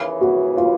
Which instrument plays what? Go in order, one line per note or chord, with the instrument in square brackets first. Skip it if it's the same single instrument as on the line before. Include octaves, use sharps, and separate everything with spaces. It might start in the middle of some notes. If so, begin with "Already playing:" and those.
Already playing: [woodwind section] D#2 C#3 E3
[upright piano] F#4
F4